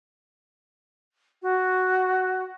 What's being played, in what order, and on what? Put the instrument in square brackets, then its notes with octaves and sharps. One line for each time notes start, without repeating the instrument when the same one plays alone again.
[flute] F#4